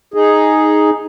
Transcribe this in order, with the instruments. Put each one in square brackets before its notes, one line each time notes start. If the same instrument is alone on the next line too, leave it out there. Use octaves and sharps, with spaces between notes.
[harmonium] D#4 G#4